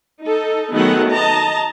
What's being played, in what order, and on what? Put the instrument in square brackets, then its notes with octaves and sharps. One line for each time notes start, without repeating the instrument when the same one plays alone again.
[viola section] D#4 A4
D#3 F#3 A3 B3 G#4 F#5
D#5 A5 A#5